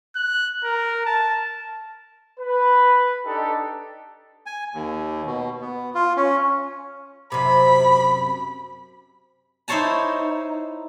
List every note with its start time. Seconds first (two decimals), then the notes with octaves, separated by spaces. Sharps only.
0.16 F#6
0.64 A#4
1.06 A5
2.40 B4
3.25 D4 D#4 G4 A4
4.46 G#5
4.74 D#2
5.26 B2
5.61 B3
5.95 F4
6.17 C#4
7.32 F#2 C3 B5
9.68 D#4 E4 C5 C#5 A5 A#5